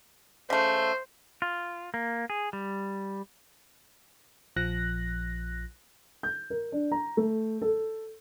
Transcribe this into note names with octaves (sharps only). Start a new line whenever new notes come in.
C#3 A3 C5
F4
A#3
G#4
G3
A#1 F3 F#6 A#6
G6
A#4
D4
A#5
A3
A4